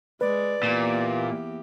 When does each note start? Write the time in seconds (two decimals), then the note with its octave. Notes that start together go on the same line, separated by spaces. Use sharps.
0.21 G#3 B4 D5
0.63 E2 A#2 A#3 G4